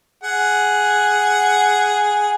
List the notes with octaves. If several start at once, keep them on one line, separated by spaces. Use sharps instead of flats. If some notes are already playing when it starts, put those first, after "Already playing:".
G#4 F#5